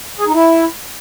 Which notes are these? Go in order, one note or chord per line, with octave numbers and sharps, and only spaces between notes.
G#4
D#4
E4